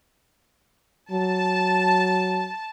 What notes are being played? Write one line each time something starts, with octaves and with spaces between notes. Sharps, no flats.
F#3 A5